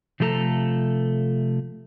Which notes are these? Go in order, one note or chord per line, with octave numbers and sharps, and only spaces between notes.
C3 F3 A3 A4 A#5